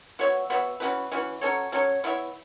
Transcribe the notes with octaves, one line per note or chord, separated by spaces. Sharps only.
B3 F#4 C#5 E5
B3 F#4 C#5 E5
E3 C#4 F#4 B4
E3 C#4 F#4 B4
F#3 C#4 A4 C#5
F#3 C#4 A4 C#5
B3 E4 C#5 E5